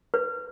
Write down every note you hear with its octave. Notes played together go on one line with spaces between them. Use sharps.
B4